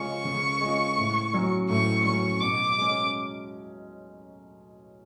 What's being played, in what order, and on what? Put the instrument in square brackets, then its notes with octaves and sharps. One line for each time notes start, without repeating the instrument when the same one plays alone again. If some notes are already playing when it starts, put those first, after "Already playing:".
Already playing: [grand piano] C#3 G#3 C#4 F4 [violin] C#6
[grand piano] C#3
G#3 C#4 F4
A2
F#3 C#4
[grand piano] A2 [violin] C#6
[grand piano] F#3 C#4 [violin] C#6
[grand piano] B2 [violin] D6
[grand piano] G#3 C#4